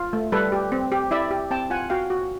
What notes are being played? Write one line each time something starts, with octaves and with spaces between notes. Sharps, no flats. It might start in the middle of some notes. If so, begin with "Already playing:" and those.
Already playing: F4
A3
G3 A4 B4
G4
C4
G4
E4 D5 E5
G4
C4 G5 A5
F4 F#5 G#5
F#4 F5 G5
F#4